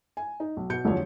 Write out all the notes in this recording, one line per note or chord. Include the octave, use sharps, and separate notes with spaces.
G#5
D#4
B1
B2 G6 C#7
E1 C2 F#2 D3 F3 C#5